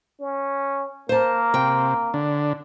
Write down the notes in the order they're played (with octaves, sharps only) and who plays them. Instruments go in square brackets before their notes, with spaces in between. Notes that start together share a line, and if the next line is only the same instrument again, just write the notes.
[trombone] C#4
[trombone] A#3 [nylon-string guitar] C5 A5
[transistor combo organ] C3 [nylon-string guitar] G5
[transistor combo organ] D3